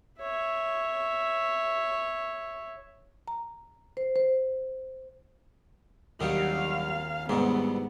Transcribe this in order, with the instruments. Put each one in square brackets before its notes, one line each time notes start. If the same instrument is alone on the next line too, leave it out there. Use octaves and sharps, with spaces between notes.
[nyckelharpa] C#5 E5
[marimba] A#5
C5
C5
[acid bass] D#2 [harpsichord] D3 F#3 G3 [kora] D#3 [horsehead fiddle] F5
[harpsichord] C2 B2 D3 [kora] G#2 [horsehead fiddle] B3